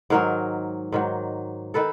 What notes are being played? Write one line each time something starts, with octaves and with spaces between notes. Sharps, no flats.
G#2 D#3 F#3 G#4 A#4
G#2 D#3 F#3
D#3 A4 B4